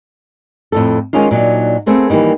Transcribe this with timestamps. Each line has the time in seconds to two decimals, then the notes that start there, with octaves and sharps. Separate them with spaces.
0.72 F2 A2 A4
1.13 D#3 G#3 C#4 D#4 F4
1.31 A#2 F#3 D4 D#4
1.86 A3 B3 C4 G#4 A#4
2.10 D#3 E3 G3 A#3